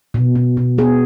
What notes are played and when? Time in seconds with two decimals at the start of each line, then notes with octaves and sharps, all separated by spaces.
0.14 B2
0.35 B2
0.57 B2
0.78 B3 G#4